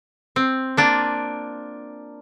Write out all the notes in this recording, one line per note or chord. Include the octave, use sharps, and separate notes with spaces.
C4
A#3 D4 F4